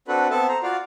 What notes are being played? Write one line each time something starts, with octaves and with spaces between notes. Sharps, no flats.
C4 D4 F#4 A4 B4
B3 C4 A4 E5 A5
C5 A#5
F4 F#4 D5 F5